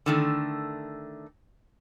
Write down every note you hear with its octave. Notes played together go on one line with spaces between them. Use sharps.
D3 D#3 A3